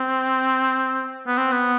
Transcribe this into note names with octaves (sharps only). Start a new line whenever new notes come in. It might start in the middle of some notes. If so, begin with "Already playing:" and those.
Already playing: C4
B3
C4
B3